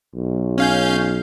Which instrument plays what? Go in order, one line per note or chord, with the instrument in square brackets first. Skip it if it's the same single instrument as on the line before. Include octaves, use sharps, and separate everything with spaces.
[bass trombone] B1
[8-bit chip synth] C#4 F5 G6